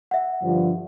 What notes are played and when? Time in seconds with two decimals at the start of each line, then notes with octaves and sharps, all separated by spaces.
0.11 E5 F#5
0.42 G2 D3 F3